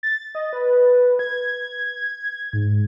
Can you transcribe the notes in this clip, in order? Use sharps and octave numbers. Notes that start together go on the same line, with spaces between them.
A6
D#5
B4
G#6
G#2